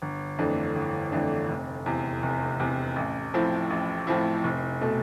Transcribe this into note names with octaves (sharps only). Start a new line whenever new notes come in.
G1
F2 E3 A3 D4
G1
F2 E3 A3 D4
F1
E2 C3
F1
E2 C3
A1
A2 F3 C4 E4
A1
A2 F3 C4 E4
F1
B2 A3